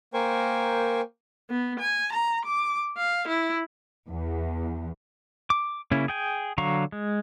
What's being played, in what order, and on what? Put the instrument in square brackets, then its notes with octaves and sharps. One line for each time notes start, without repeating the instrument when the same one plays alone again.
[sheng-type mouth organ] A#3 A#4 C5 G5 G#5 C#6
[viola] B3
G#5
A#5
D6
F5
E4
[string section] E2
[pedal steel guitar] D6
C#3 A#3 C#4 E4
G#4 G5 G#5
D3 F#3 F5 A#5 C#6
G#3